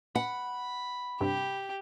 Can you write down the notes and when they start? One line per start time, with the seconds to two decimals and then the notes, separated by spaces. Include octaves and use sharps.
0.16 F#5 B5
1.21 G2 C3 G4